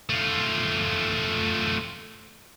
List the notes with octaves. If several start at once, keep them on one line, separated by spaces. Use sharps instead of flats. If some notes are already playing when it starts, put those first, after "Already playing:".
A3 F4